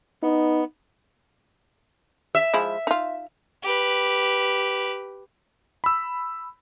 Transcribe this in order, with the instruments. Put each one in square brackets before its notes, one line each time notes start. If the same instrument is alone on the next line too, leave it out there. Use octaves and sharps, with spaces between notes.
[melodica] B3 [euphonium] D#4
[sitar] E5
[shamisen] F3 G#3 E4
D#4 F4
[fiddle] G4 B4
[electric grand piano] B5 E6